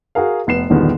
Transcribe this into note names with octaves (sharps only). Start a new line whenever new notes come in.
F#4 G#4 A#4 F5
F1 B3 C7 E7
E1 C2 A#2 D3 D#3 B3